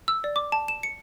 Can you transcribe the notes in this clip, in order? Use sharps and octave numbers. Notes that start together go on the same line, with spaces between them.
E6
D5
D6
A5
E7
C#7